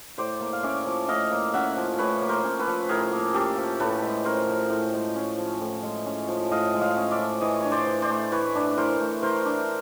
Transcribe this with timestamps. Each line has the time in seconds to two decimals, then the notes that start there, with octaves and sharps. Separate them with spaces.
0.18 A2 C5 D5
0.40 A#3
0.53 F5
0.63 C#4 D5 E5
0.86 F3
1.08 A2 D#5 F5
1.31 A#3
1.54 C#4 E5 F#5
1.76 F3
1.98 A2 B4 C#5
2.22 A#3
2.29 A#4 C5
2.44 C#4
2.59 A4 B4
2.67 F3
2.89 A2 G#4 A#4
3.12 A#3
3.34 C#4 G4 A4
3.57 F3
3.80 A2 A4 B4
4.02 G#3
4.25 C#4 A#4 C5
4.47 F3
4.70 A2
4.93 G#3
5.16 C#4
5.38 F3
5.61 A2
5.83 G#3
6.06 C#4
6.28 F3
6.51 A2 D#5 F5
6.74 G#3
6.81 D#5 F5
6.96 C#4
7.11 D5 E5
7.18 F3
7.41 E3 C#5 D#5
7.60 D4 C#5
7.71 C5 D5
7.86 E3
8.02 C5 D5
8.09 A3
8.32 E3 B4 C#5
8.55 D4
8.77 E3 A#4 C5
9.00 A3
9.22 E3 A#4 C5
9.45 D4